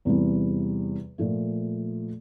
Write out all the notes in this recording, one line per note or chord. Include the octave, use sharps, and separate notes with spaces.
E2 C3 E3 G3
A#2 F3 A3